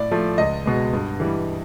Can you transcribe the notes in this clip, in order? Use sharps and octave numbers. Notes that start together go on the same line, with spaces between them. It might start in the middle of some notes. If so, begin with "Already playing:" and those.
Already playing: A2 D5
F3 A3
C#2 D#5
B2 G#3
G2
E3 G3